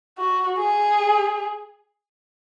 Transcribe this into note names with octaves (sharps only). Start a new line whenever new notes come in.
F#4
G#4